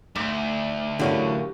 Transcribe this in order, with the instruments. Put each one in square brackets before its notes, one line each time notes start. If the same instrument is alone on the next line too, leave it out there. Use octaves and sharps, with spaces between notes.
[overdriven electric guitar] D2 [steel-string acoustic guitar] D#4 [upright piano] D6 B6 E7
[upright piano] A2 E3 [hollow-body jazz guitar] D3 F#3 C#4 [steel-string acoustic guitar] G4 A#4 F5